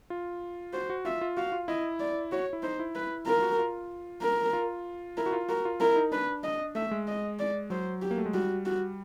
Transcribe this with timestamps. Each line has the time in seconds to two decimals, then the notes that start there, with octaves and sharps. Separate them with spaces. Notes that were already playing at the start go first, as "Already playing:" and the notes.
0.10 F4
0.73 F#4 C5
0.90 F#4
1.05 F4 E5
1.21 F4
1.37 F#4 F5
1.52 F4
1.68 E4 D#5
2.00 D5
2.32 F#4 C#5
2.53 E4
2.63 D#4 C5
2.80 E4
2.95 B4
3.27 F4 A#4
3.43 F#4
3.59 F4
4.22 A#4
4.53 F4
5.17 E4 A#4
5.26 F#4
5.33 F4
5.49 F#4 A#4
5.65 F4
5.80 E4 A#4
5.96 D#4
6.12 D4 B4
6.44 D#5
6.75 A3 E5
6.87 A3
6.91 G#3
7.08 D#5
7.39 D5
7.70 F#3 C5
8.02 G4
8.11 A#3
8.18 A3
8.26 G#3
8.34 G3 F#4
8.66 F#4